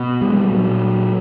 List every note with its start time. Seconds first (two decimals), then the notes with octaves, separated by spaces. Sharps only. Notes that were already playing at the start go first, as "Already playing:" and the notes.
Already playing: B2
0.22 G3
0.29 G#3
0.37 G3
0.51 A#2 F#3